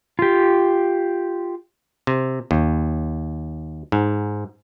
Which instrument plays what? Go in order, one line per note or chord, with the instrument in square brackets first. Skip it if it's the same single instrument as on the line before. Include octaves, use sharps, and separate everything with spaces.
[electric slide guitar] F4 G4
[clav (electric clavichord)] C3
D#2
G#2